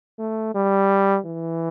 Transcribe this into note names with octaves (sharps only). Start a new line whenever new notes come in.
A3
G3
E3